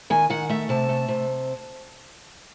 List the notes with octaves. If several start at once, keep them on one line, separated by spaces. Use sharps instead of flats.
D#3 G#5
D#3 F#5
A3 E5
C3 A5
A3
C3